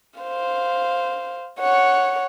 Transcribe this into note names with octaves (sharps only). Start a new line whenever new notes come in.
C5 F5
C#5 F#5